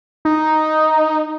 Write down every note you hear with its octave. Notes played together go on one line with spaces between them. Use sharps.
D#4